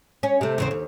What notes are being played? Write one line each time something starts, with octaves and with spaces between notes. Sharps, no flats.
C#4
C3 A3
E2 C#3 C4
D#2